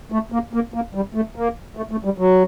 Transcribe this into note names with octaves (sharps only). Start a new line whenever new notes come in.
A3
A#3
A#3
A#3
G3
A3
A#3
A3
A3
G3
F#3